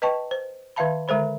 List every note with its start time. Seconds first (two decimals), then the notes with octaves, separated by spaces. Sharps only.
0.02 B4 D#5 G5 A5 C#6
0.31 C5
0.76 D#3 B4 E5 F5 A5 B5
1.08 D3 G#3 A4 C5 B5